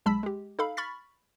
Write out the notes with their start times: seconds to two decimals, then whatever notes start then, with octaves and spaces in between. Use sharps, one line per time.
0.06 B1 G#3 A5 B5 E6 B6
0.23 G#3 G4
0.59 D#4 A4 F5 B5
0.77 B5 C#6 F6 A6 B6